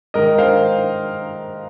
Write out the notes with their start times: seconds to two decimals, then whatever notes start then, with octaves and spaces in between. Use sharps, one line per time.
0.14 G#2 D#3 A#4 D#5
0.38 C5 F5